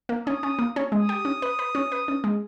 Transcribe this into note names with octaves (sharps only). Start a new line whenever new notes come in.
A#3
C#4 D#6
C#4
A#3
C#4
G#3 D#6
G4
C#4
B4
B4
C#4
B4
C#4
G#3